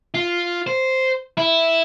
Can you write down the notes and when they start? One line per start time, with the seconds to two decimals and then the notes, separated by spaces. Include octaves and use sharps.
0.14 F4
0.67 C5
1.37 E4